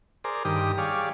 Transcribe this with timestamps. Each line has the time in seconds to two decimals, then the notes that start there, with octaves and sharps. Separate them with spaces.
0.24 G#4 A#4 C5 D5
0.45 G2 D#3 G4 D#6
0.78 G3 G#4 C#5 D5 F5